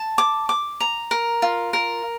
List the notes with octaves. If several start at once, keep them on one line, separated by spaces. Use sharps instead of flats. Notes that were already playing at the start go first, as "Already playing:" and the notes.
Already playing: A5
D6
D6
A#5
A#4
F4
A#4